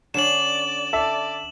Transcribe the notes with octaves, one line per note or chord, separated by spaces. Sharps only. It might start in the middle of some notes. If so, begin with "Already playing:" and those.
D3 C#4 D5 E7 F#7
A4 D5 E5